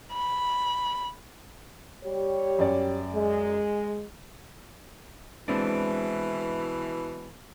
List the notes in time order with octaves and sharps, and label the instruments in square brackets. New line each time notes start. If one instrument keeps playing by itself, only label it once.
[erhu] B5
[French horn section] G3 G4 C#5
[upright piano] F#2 D5
[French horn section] G#3
[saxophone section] B2 E3 [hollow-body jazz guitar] G#3 C4 D4